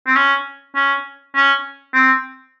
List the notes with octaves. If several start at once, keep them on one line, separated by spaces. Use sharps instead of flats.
C4
C#4
C#4
C#4
C4